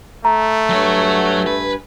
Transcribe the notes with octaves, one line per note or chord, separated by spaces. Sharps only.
A3 A#5
G2 F#3 C#5 G#5
B4